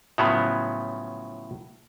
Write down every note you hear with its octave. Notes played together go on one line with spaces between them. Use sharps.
A2 C#3 F3 F#3 B3